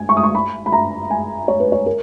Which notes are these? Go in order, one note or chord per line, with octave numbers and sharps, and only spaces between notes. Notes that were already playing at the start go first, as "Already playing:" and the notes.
Already playing: G#5
C#6
D#6
C#6
B5
B5
A#5
G#5
C#5
B4
C#5
A#4